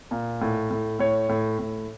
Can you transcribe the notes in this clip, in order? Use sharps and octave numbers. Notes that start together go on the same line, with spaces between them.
A#2
A2
A2
A2 C#5
A2
A2